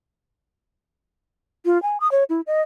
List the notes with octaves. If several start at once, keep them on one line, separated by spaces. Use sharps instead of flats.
F4
G#5
D#6
C#5
E4
D#5